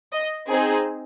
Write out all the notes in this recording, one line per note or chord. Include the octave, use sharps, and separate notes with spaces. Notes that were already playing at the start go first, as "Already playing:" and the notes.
D#5
C4 D#4 G#4